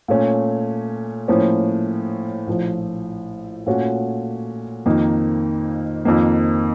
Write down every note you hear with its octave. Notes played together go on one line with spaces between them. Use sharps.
A#2 A3 C#4
A2 F3 A#3 C#4
A#1 A2 F3
A#2 A3 C#4 F#4
F2 D#3 A#3 D#4
F2 D#3 A#3